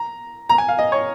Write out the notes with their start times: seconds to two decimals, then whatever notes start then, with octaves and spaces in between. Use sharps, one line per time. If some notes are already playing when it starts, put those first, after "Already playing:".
Already playing: A#5
0.49 A#5
0.58 G#5
0.68 F5
0.79 D#5
0.92 C#5